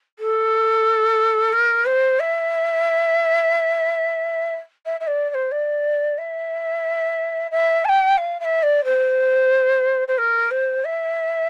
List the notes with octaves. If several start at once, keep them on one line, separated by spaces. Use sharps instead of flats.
A4
A#4
C5
E5
E5
E5
D5
D5
C5
D5
E5
E5
A5
G5
F5
F5
E5
D5
C5
C5
A#4
C5
E5